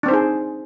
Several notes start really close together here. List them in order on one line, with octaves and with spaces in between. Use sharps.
D4 C4 C5 D#4 G#4